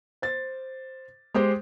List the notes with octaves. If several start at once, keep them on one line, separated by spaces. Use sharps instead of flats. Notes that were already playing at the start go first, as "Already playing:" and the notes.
C5 A6
G#3 G4 G#4 C5